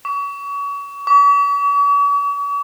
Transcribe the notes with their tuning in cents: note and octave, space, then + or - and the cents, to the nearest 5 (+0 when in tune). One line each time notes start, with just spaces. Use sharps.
C#6 +35
C#6 +45